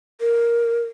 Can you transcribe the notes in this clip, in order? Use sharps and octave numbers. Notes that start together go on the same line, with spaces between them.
A#4